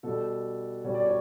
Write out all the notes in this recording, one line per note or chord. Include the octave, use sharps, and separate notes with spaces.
B2 G3 A4
B2 G3 C#5
D5
C#5